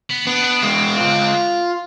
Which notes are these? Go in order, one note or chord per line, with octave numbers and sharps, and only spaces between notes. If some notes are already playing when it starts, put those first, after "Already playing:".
B3
B3 D4
D4
G#3 C4
F4